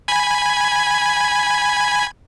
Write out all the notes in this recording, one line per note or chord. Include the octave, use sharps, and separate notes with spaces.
G#5 B5 G#6